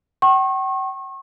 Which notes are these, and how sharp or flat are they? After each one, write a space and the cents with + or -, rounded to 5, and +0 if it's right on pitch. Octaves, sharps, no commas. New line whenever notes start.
G5 -45 C#6 -35